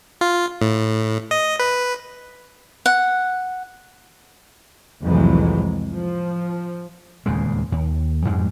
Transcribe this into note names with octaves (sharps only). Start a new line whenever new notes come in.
F4
A2
D#5
B4
F#5
C2 F2 A2 E3 F#3 G#3
F3
D#1 E2 C#3 G#3
D#2
F2 G#2 G3 G#3